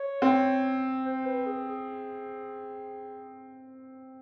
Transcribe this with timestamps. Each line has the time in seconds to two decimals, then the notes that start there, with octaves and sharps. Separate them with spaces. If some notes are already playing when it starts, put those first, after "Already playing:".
Already playing: C#5
0.22 C4
1.05 C5
1.25 B4
1.46 G#4
1.67 G#4